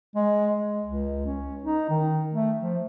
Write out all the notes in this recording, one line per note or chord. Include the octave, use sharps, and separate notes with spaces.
G#3
G#3
C#2
C#4
D#4
D#3
A3
F3